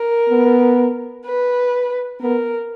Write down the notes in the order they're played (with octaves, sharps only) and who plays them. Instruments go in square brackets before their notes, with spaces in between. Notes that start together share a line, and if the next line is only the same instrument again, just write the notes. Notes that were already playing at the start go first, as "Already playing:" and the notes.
Already playing: [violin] A#4
[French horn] B3
[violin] B4
[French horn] B3 [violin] A#4